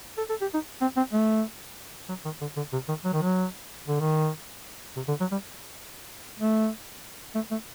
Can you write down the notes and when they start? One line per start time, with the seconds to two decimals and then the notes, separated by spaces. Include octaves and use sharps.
0.18 A4
0.29 A4
0.41 G4
0.54 D#4
0.81 C4
0.97 C4
1.13 A3
2.09 F#3
2.25 D#3
2.41 D3
2.57 D3
2.73 C3
2.88 D#3
3.04 F#3
3.13 D#3
3.22 F#3
3.88 D3
4.00 D#3
4.96 C3
5.08 D3
5.20 F#3
5.32 G3
6.39 A3
7.35 A3
7.51 A3